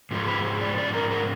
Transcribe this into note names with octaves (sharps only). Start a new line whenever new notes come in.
G#2 F3 G#3
B4
D5
D5
A#4
A#4